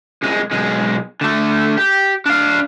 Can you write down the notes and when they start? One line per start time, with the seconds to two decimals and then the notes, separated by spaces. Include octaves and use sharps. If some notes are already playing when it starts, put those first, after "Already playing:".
0.23 C2 G#3
0.51 B1 G#3
1.21 D3 A3
1.77 G4
2.26 D4 F5